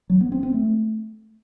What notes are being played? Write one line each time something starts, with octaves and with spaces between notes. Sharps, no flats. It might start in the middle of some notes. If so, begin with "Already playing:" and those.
F#3
B3
C4
C4
A3